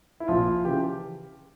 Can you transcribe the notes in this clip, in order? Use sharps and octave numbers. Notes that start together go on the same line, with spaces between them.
E4
A#1 A#2 F3 F4
C#3 E3 G4